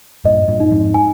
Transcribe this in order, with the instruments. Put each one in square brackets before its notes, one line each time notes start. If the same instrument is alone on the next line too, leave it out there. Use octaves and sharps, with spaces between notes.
[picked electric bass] G2 A#2 [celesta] D#5
[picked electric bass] G2 A#2
[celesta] D#4
[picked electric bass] F2 G#2
[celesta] G#5